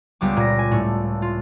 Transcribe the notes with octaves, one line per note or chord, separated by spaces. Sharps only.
C#2 G3 B3 D6
A#2 A#6
G#5
A2 A3
F4